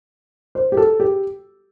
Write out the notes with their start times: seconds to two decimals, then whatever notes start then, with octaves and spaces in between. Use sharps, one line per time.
0.55 C5
0.72 G4
0.77 A4
1.00 G4